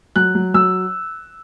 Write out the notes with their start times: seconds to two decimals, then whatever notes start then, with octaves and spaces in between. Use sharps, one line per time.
0.16 F#3 F#6
0.35 F#3
0.54 F#3 E6